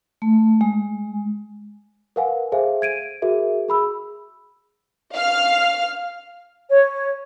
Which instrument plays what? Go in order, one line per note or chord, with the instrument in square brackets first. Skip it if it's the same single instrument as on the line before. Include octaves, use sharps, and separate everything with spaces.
[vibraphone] A3
G#3
[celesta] A#4 B4 F5 F#5 G#5
G#4 A4 C5 E5 F5 G#5
G#6 D7 D#7
F#4 G#4 A#4 E5
G#4 B5 E6
[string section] F5 F6
[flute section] C#5